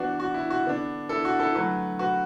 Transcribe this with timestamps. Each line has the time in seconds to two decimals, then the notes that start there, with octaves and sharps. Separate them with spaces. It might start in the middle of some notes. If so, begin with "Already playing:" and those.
Already playing: E3 B3 D4 F#4
0.20 F#4
0.34 E4
0.50 F#4
0.65 D3 B3 D4
1.09 E4 A4
1.25 F#4
1.39 E4 A4
1.55 D3 F#3 A3 F#4 B4
1.99 F#4 B4